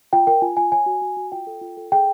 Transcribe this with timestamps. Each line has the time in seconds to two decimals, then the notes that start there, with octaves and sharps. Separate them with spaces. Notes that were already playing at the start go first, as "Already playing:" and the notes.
0.13 F4 G5
0.27 A#4 G5
0.42 F4 G#5
0.57 F4 G#5
0.72 C#5 G#5
0.86 F#4
1.02 F#4
1.17 F#4
1.32 F4 G5
1.47 A4
1.61 F4
1.77 A4
1.92 G#4 G5